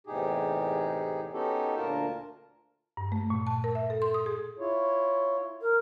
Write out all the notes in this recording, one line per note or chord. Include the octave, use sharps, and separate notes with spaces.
E2 A2 C3 D#4 G4 G#4
B3 C#4 D#4 F#4 G4 A4
D2 A#2 F4 A#4 A5
G2
A3
A#2
A5
A#4
E5
A4
C6
D#6
G#4
E4 F4 C#5
D2 A#4